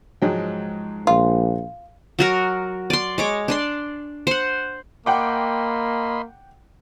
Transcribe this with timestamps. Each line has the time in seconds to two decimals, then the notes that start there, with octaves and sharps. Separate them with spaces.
0.22 G#2 F3 F#3 G#3 G5
1.07 A#1 F4
2.19 F#3 F#4 A#4
2.90 D5 C6
3.18 G#3 C#5 D6
3.48 D4 D5 C6
4.27 C5 F#5
5.06 A#3 D#5 F#5 G5 B5 C6 D6